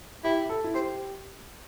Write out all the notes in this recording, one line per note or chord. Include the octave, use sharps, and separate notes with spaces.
E4 G4
A4
E4
G4 C5